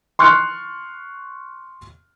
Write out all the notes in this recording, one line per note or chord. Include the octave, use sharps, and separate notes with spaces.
C6 C#6 F6 F#6 C#7